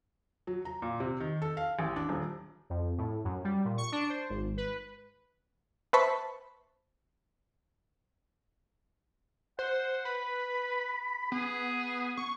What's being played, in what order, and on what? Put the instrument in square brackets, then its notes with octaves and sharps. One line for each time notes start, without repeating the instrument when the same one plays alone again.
[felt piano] F#3
A#5
A#2
C3
D#3
A4
F5
A1
D4
D#1
[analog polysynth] F2
A2
F#2
G3
A#2
C#6
D4
C5
G#1
B4
[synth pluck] B4 C5 E5 A5 B5 C#6
[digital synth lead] C5 [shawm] F#5
[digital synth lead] B4 [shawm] B5
[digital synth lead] B3 [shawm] G#4
[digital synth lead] C#6